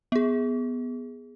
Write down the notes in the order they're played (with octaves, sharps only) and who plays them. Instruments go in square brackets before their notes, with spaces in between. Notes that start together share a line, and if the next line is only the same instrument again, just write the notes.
[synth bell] B3 G#4